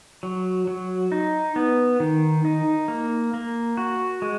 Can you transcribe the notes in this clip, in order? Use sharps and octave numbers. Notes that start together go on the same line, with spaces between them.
F#3
F#3
D#4
B3
D#3
D#4
A#3
A#3
F#4
G#3